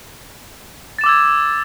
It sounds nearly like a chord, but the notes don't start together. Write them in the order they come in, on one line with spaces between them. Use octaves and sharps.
A6 E7 D6 E6 G#6